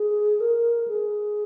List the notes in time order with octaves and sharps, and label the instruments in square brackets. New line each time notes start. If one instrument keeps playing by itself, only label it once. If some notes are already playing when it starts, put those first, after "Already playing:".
Already playing: [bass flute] G#4
A#4
G#4